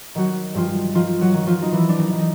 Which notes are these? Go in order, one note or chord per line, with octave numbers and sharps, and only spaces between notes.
D#3 F#3 F#4
G2 F3 F4
D#3 F3 F4
F#3 F#4
D#3
F3 F4
D#4
D#3 E3 E4
D4
D#3 D#4
D#3
D#4